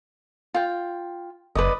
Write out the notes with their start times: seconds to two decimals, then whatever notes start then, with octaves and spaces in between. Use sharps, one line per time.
0.54 F4 G5
1.55 F#1 B4 D5 D#5